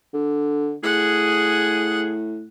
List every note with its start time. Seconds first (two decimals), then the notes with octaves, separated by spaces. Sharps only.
0.14 D3
0.83 A2 G#4 F#5